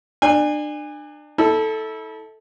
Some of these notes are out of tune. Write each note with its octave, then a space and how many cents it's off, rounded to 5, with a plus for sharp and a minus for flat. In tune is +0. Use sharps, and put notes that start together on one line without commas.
D4 +30 G#5 -25
E4 -40 A4 -5